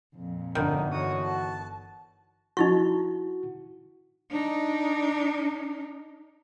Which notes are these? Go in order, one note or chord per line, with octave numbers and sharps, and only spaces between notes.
F2 A#2
G1 D3 D#3 D#4
E3 F#4 C#5 D#6
A5
D#4 E4 F#4 C#6
D4 D#4